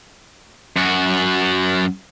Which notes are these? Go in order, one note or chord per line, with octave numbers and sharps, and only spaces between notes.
F#2 F#4